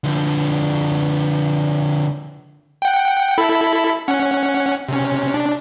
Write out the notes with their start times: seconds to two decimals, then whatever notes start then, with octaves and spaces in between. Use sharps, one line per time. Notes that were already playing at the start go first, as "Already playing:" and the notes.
0.04 D3 F3
2.82 F#5 G5
3.38 E4 A4 B5
4.08 C#4 F#5
4.89 C3 C#4
5.34 D4